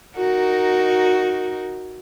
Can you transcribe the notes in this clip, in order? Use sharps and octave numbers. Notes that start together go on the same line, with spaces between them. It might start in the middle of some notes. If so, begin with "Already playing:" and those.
D#4 F#4 A#4